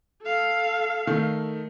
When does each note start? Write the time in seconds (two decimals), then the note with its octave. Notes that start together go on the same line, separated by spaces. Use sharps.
0.22 A4 F5
1.07 D#3 A3